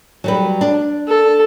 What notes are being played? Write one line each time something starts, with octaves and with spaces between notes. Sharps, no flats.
F#3 G3 B4
D4
A4